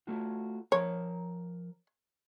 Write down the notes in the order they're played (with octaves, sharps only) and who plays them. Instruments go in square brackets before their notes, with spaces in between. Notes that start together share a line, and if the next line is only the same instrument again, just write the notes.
[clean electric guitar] A3 F4 F#4
[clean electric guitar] F3 A#4 A#5 [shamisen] C#5